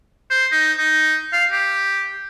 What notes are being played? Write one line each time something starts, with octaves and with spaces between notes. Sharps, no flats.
C5
D#4
D#4
F5
G4